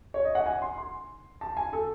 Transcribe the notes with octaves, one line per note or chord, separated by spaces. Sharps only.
C#5
D#5
F#5
G#5
C6
C6
A5
G#5
A4